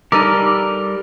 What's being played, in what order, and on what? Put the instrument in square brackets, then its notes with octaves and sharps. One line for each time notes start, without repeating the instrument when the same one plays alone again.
[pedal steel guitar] G3 A#4 [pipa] D#4 A4 [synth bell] D6